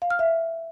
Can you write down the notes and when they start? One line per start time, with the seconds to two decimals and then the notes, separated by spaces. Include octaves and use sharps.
0.02 F5
0.10 F6
0.19 E5